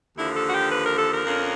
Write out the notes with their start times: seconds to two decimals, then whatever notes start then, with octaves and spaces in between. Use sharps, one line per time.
0.16 D#2 D3 F3 E4
0.35 A4
0.48 F#4
0.53 G4
0.71 B4
0.85 A#4
0.98 A4
1.12 A#4
1.25 F2 D3 F3 A#3 C#4